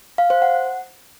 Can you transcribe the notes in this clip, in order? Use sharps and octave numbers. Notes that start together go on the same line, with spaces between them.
F5
C5
F#5